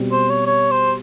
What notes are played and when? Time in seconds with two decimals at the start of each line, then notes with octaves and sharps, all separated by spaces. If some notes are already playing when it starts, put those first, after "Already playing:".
Already playing: B2 G3 C4
0.12 C5
0.29 C#5
0.46 C#5
0.71 C5